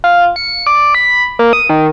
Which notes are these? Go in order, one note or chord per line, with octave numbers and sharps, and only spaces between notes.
F4
C#7
D5
B5
A#3
D#6
D#3